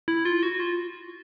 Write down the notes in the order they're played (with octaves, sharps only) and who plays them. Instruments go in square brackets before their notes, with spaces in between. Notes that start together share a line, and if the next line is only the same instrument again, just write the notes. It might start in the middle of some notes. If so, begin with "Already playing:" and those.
[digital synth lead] E4
F4
F#4
F4